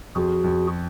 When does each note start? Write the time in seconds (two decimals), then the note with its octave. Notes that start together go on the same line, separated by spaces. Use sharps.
0.15 F2 F#4 G#4
0.44 F2